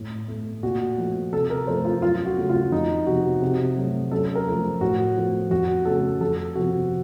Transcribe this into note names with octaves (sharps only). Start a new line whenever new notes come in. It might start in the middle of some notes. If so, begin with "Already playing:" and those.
Already playing: A2
A3
A#2 F#4
F3 A3
C3 A4
A#4
F3 A3 C5
F4
F#2 F4
F#4
C#3 A3
F4
F2 D#4
C3 F3 F#4
C3
F#3 A3
F#2 A4
A#4
F3 A3
A2 F#4
F3 A3
F2 F#4
C#3 A3 A4
F2 A4
C3 F3 F#4